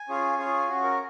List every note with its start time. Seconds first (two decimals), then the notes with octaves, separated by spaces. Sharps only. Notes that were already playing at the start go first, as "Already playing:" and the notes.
Already playing: G#5
0.09 C#4 F4 G#4
0.38 C#4 F4 G#4
0.68 C#4 F#4
0.83 A#4